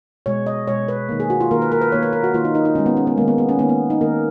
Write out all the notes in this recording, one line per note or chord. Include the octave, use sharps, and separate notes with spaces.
B2 G#3 C#5
D#5
B2 G#3 C#5
B4
D#3 A#3
G#4
F#4
F4
D#3 A#3 A#4
B4
A#4
B4
D#3 A#3 C#5
B4
A#4
F#4
D#3 A#3 F4
D#4
D#4
D#4
D#3 G#3 C#4
B3
C#4
B3
D#3 G#3 A#3
B3
B3
C#4
D#3 A#3 B3
B3
D#4
D#3 A#3 A#4